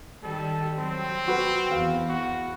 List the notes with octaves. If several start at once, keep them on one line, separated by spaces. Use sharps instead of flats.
D#3 G3 A4
F#3 C4
F#4 B4
E2 F5
F#4